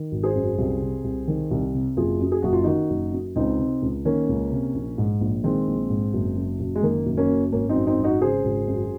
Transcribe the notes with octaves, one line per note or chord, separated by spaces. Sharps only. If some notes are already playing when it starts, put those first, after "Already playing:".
Already playing: D#3
G#1
G#4 C5
F#2
C2
C3
C2
D#3
C2
C3
F#1 F4 G#4
F#2
G#4
F#1 F#4
F4
D#3 D#4 F#4
F#1
F#2
C#2 C4 D#4
C3
C#2
D#3 A#3 C#4
C#2
C3
A#1
G#2
A#1
D#3 G#3 C4
A#1
G#2
F#1
F#2
F#1
G#3
D#3 A#3
F#1
A#3 C#4
F#2
G#1 A#3 C#4
C4 D#4
F#2
C4 D#4
G#1
D#4 F#4
C#3 G#4 C5
G#1
F#2